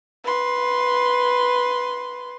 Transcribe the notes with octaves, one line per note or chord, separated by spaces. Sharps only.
B4 C6